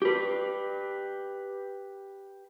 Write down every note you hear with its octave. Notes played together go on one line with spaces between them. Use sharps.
G4 B4